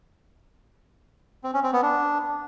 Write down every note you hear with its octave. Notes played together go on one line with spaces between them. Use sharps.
C4
C#4
C4
B3
D4